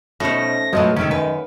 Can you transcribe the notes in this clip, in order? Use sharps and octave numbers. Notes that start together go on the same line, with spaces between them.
B2 A3 C#4 D#4 C5 A#6
B1 A2 F3 F#3 G#3 D#5
C3 D#3 G#3 C#4 D#4 E4
F#2 B4